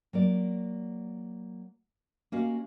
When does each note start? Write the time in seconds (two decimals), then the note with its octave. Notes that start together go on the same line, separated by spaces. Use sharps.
0.13 F#3 A#3 D5
2.32 A#3 C#4 F#4 G4 D#5 F5